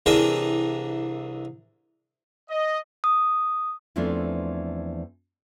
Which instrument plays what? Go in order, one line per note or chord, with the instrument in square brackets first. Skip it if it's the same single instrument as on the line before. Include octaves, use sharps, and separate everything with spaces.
[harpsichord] C2 E3 D4 G#4 A#4 G5
[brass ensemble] D#5
[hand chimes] D#6
[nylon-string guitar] E2 E3 F3 A3 C4 D4